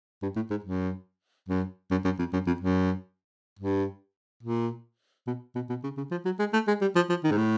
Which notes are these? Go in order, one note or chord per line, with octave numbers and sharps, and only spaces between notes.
G2
A2
G#2
F#2
F#2
F#2
F#2
F2
F#2
F2
F#2
G2
A#2
B2
B2
B2
C#3
C#3
F3
F#3
G#3
A3
G#3
G3
F3
F3
D#3
G#2
A2